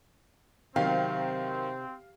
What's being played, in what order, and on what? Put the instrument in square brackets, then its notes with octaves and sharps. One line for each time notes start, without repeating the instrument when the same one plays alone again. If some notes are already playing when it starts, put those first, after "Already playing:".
[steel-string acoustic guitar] C3 [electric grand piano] D#3 F#3 [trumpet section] C4 [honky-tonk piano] F5